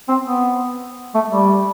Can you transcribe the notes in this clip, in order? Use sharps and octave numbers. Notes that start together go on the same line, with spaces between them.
C4
B3
A3
G3